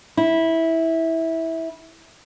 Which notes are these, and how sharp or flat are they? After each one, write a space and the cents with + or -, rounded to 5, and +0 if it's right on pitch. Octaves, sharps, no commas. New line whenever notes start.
E4 -15